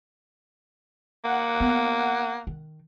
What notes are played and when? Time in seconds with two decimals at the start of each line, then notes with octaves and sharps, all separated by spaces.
1.24 A#3 F#5
1.60 B3
2.47 D#3